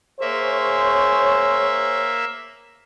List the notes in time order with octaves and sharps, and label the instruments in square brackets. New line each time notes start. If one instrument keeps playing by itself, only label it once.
[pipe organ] A#3 E5 [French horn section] G#4 C5 C#5